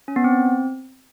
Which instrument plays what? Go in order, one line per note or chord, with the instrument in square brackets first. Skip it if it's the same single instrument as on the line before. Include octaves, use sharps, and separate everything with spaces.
[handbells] C#4
B3
C4